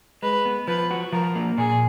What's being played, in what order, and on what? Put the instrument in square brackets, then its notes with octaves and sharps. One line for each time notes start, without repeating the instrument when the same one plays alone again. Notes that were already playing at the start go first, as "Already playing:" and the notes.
[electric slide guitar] G#3 [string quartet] B4
[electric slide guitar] B3
[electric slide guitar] F3 [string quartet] B4
[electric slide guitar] F#4
[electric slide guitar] F3 [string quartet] A#4
[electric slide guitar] A#3
[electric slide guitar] A#2 [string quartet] G#4